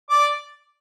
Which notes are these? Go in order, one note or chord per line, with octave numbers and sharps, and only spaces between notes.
D5 D6